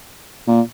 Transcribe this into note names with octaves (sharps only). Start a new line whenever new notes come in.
A#2